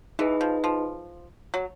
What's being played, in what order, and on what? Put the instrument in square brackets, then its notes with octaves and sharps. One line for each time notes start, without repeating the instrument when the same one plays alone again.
[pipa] E3 [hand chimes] D#4 G#4 B4 D#5
[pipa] F3
F3
F#3